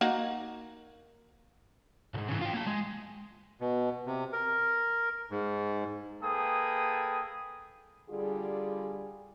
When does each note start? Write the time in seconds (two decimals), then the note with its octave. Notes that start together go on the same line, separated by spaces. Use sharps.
0.01 A#3 D#4 F#4
2.14 B1 G#2
2.28 C#3 E3
2.41 F4 G5
2.54 A#3 A5
2.66 G#3
3.61 B2
4.06 C3
4.33 A#4
5.31 G#2
6.22 A#3 G#4 A4 B4 G5 D#6
8.10 D3 G3 F4 G#4